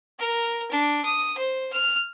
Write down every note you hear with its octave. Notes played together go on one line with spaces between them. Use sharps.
A#4
D4
D#6
C5
F6